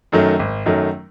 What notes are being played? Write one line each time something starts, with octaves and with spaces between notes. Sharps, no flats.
F#2 D#3 F#3 A3
G#1
F#2 D#3 F#3 A3